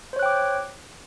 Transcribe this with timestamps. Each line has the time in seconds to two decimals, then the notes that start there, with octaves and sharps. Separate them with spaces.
0.13 C5
0.16 C#5
0.19 F#6
0.23 G5
0.26 D6